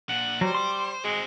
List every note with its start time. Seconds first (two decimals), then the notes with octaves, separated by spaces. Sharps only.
0.09 A#2 D4 F#5
0.41 F#3 G3 C5
0.55 C6 D6
1.04 G#3 C4 F#4